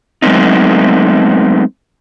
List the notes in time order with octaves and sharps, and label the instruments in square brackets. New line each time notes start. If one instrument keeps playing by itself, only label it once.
[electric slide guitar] F#3 G#3 A3 B3 C4 D#4